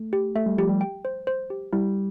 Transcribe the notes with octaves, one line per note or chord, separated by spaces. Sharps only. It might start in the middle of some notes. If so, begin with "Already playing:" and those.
Already playing: A3
G4
A3 E5
G3
F3 G4
G3
G5
C5
C5
G4
G3 E4